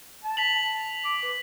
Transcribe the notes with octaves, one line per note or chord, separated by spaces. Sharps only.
A5
B6 F7 F#7
A5
D6
B4